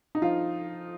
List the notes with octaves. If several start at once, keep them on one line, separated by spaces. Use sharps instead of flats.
D#4
F3 F4